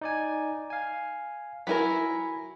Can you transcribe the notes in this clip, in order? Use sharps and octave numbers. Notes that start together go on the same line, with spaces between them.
D#4 D5 G#5
F5 G#5
F#3 E4 A#4 G#5 B5 B6